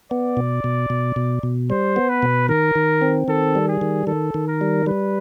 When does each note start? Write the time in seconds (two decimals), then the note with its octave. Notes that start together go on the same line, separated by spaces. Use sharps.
0.11 B3 D5
0.37 B2
0.64 B2
0.90 B2
1.16 B2
1.43 B2
1.70 G3 C5
1.96 B3
2.09 B4
2.23 B2
2.49 D#3 A#4
2.75 D#3
3.02 C4
3.28 D#3 A4
3.55 G3
3.69 G#4
3.81 D#3
4.07 D#3 A4
4.34 D#3
4.47 A#4
4.61 G3
4.86 G3 B4